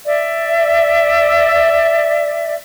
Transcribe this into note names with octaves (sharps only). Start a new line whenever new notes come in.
D5 E5